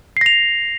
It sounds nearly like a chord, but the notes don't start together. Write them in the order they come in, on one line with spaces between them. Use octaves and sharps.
C7 A#6 F7